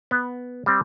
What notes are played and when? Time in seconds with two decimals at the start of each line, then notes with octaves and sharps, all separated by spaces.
0.11 B3
0.66 G3 C4